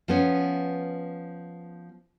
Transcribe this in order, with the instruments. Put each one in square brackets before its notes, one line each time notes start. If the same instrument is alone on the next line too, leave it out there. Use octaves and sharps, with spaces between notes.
[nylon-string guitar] F3 B3 C#4